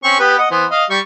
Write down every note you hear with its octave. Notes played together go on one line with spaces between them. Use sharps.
C4 C#4 C#6
B3 G4 B4
D#5 F#5
E3 B3 C5
D#5 F5
G3 C#6